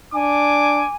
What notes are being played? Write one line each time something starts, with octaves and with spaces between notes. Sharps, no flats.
D4 G#5 D6